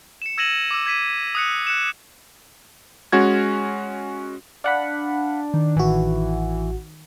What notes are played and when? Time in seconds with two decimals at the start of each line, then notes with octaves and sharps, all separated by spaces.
0.22 C#7 E7
0.38 E6 G#6 A#6 D#7 E7 F#7
0.71 D6 E6
0.86 G#6 B6 D#7
1.35 D#6 F#6 C#7
1.67 F#6 C#7 E7
3.12 G#3 C#4 F#4 G#6
4.64 D4 F5 F#5 B5
5.54 D#3
5.77 A1 E3 F#4